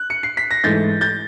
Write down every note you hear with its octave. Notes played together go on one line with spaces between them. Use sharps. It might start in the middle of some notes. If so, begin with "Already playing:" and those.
Already playing: F#6
C#7
C7
B6
A#6
G#2 E3 A3 G6 A6
G6 A6